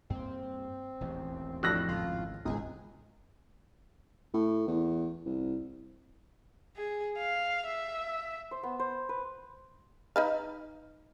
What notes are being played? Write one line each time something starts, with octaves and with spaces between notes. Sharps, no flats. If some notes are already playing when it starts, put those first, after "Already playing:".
G2 A#3 C4
E1 A1 D#2
F2 A2 D4 E6 F#6 A#6
G#1 C#2 F4
D1 G#1 C#2 F#2 G#4
A2
E2
C2
G#4
F5
E5
C5
B3
C5
B4
D#4 B4 F5